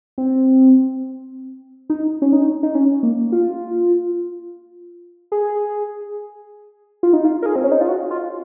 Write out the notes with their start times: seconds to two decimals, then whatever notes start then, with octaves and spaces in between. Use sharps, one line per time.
0.18 C4
1.90 D#4
2.22 C#4
2.33 D#4
2.63 D#4
2.75 C#4
3.03 A#3
3.32 F4
5.32 G#4
7.03 F4
7.13 D#4
7.25 F4
7.42 A#4
7.46 G#4
7.56 C4
7.64 C#4
7.72 D#4
7.81 F4
7.88 F#4
8.11 F4